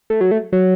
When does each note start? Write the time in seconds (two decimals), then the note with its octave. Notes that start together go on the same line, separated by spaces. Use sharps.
0.10 A3
0.21 F#3
0.31 A3
0.52 F#3